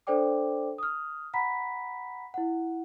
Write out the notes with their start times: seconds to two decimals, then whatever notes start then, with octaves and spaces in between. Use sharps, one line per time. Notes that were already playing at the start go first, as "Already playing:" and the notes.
0.07 D4 A4 C5 D5 G5 D6
0.78 D#6 F6
1.34 F#5 A#5 B5 B6
2.34 E4 F#5